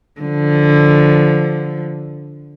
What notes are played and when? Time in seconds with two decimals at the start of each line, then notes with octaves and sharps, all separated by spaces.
0.21 D3 F3